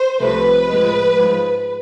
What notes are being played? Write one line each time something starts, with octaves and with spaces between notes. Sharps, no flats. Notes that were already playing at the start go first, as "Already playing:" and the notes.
Already playing: C5
C2 C3 F3 A3 B4
A2 F3 G#3
G#2 F3 G#3